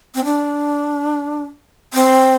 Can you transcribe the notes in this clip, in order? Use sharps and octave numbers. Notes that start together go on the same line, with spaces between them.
C4
D4
C4